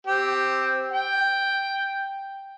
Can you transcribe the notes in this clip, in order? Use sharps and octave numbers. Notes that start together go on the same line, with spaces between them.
C4 G4
G5